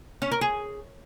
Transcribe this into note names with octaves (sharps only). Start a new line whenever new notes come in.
C#4
A#4
G#4